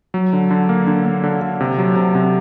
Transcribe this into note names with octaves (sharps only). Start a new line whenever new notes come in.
F#3
D3
D3
A#3
D3
A#3
D3
D3
C3
F#3
C3
C3